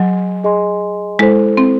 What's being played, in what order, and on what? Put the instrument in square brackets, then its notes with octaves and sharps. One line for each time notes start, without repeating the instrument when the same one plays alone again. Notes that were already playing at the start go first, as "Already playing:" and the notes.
Already playing: [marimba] F#3 [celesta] G#4 D#5 G#5 C6
[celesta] G#4 D#5 G#5 C6
[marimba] G#3 [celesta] E4 A4 C5
[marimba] C4